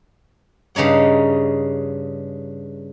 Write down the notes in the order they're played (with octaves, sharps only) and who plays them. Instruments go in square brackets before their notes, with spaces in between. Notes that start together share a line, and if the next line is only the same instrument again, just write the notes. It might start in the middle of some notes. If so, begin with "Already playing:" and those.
[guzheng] G2 C#3 D#4 C#5 F#5